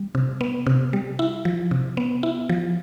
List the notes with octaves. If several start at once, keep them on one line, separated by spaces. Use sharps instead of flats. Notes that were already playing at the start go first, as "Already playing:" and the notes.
Already playing: G3
C3
B3
C3
G3
E4
F3
C3
B3
E4
F3